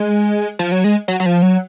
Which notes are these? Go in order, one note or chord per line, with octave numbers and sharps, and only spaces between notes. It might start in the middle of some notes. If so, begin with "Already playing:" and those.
Already playing: G#3
F3
F#3
G#3
F#3
F#3
F3
F#3